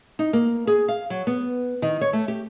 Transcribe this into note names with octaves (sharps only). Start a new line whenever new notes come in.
D#4
A#3
G#4
F5
F#3
B3
D#3
C#5
A3
G4